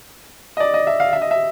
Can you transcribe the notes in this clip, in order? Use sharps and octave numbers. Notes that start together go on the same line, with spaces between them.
D#5
D5
D#5
E5
F5
E5
D#5
E5